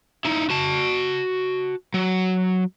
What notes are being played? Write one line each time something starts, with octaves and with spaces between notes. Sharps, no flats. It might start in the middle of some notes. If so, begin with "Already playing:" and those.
D#4 E4
F#4 A5
F#3